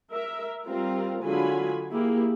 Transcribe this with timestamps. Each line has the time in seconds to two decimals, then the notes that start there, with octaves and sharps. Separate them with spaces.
0.13 A#4 E5
0.66 G3 C4 F4 A#4
1.23 D3 F#3 G#3 F4 G#5 B5
1.91 A#3 E4 G4 G#4